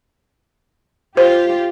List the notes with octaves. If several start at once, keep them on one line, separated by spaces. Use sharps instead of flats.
F4 G4 C5